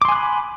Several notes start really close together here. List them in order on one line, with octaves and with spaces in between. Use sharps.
D6 C6 G#5 F#6 B5